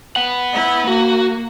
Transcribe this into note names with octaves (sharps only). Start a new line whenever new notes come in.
B3 F#5
E4
A#3 F#4